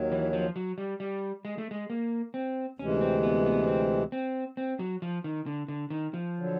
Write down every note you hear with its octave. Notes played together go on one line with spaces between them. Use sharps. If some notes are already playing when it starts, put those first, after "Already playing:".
Already playing: D#2 D#3 F#3
E3
F3
F#3
G3
G3
G#3
A3
G#3
A#3
C4
D2 C3 E3 G#3 C#4
C4
B3
B3
B3
C4
C4
C4
F#3
F3
D#3
D3
D3
D#3
F3
D3 F#3